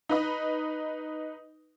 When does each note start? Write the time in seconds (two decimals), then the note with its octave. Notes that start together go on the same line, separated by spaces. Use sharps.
0.09 D#4 B4 D#5